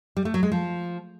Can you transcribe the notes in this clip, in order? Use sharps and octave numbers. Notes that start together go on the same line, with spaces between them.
G3
A3
F#3
G#3
F3